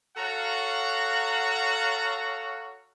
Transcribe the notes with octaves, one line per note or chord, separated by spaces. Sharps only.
F#4 A4 C#5 F5 F#5 A#5